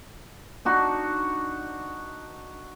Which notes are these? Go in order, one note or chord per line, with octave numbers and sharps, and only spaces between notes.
D4 D#4 F#4